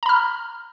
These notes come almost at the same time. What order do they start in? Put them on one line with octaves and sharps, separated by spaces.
A#5 B5 F6